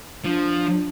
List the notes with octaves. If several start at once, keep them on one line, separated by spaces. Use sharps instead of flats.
F3 D4